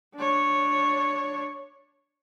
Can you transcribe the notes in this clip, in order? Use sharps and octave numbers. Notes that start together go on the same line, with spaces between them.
D4 C#5